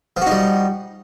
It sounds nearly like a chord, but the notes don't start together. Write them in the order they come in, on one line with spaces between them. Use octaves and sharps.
F3 F#4 D#4 G3